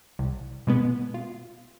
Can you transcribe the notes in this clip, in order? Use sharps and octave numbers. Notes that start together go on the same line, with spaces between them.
C2
B2 G#3 B3
F4